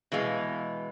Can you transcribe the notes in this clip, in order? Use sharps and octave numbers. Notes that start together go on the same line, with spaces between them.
B2 E3 G#3 F5